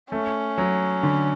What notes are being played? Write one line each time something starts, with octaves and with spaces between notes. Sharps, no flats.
A3 C#4
F#3
D3